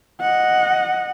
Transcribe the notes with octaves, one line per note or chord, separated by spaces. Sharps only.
D#5 F#5